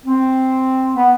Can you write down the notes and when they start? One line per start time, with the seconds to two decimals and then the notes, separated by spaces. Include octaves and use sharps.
0.06 C4
0.96 B3